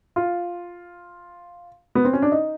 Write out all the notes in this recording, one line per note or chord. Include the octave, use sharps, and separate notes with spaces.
F4
B3
C4
C#4
D4
D#4